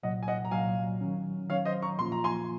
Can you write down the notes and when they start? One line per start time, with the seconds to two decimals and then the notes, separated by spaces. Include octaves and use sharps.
0.03 C2 A#2 F#3 D#5 F#5
0.23 G#5
0.28 D#5 F#5
0.45 A#5
0.51 C2 A#2 F#3 F5 G#5
1.01 D#3 F#3 C#4
1.49 D#3 F#3 C#4 C#5 F5
1.65 C5 D#5
1.82 A#5 C#6
1.99 A#2 F3 A#3 F4 C6
2.12 A#5
2.24 G#5 C6